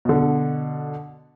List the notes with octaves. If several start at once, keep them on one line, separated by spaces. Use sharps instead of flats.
B2 D3